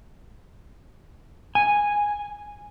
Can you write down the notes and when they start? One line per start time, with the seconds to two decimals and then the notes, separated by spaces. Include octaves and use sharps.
1.55 G#5